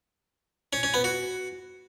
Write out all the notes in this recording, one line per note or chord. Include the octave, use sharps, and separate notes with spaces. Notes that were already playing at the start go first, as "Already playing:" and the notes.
C#4
C#4
B3
F#4